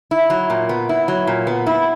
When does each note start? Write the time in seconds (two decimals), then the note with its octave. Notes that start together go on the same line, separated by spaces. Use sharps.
0.11 E4
0.30 F#3
0.50 A#2
0.69 B3
0.89 E4
1.08 F#3
1.27 A#2
1.47 B3
1.67 E4